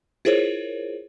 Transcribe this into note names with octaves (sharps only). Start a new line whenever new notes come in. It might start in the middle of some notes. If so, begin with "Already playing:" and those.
E4 F4 G#4 A#4 C5 C#5